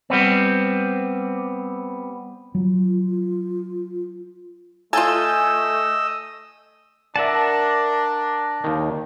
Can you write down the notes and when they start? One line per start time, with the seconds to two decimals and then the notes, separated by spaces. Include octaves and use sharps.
0.10 G3 B3 C4
2.55 F#3 F4
4.93 A3 F4 A4 D#5 G#5 E6 G6
7.16 D4 A#4 D5 E5 F#5 A5
8.64 D#2 D#3